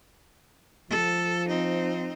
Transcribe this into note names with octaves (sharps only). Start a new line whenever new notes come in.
F3 A4
C4 D#4